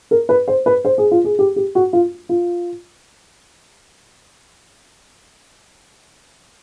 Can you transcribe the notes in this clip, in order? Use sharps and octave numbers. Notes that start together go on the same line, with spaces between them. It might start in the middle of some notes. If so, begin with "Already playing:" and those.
A#4
B4
C5
B4
C5
G#4
F4
G#4
G4
G4
F#4
F4
F4